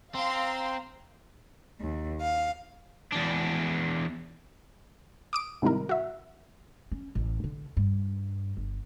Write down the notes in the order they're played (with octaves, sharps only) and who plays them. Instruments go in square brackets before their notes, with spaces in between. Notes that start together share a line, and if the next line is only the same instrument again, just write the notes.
[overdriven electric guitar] C4 [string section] F5 A#5 C6
[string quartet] D#2
F5
[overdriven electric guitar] E2 D4
[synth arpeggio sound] D6 D#6 D7
G#2 C3 D#3 G3 E4 A#4
F#4 E5
[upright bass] C#4
A1
D3
G2
G1